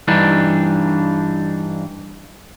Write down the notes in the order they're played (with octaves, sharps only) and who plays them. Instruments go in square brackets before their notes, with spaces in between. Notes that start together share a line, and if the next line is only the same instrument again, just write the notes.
[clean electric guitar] G2 E3 D4 D#4